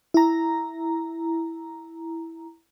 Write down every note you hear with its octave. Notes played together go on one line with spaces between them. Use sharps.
E4 A#5